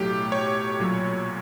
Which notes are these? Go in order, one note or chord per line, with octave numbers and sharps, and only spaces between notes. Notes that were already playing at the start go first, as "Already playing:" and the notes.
Already playing: B1 A2 F#3 A3 G4
C#5
B1 A#2 F#3